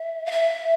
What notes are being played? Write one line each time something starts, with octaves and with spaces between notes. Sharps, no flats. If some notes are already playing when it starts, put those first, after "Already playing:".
Already playing: E5
F5
E5